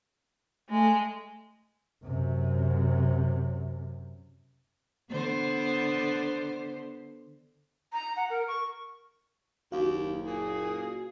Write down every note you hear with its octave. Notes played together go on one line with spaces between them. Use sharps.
G#3 A3
F#2 C3
D3 B3 C5
A#5
F#5
A#4
C#6
F#1 D#2 F#4 F5
A#2 G#4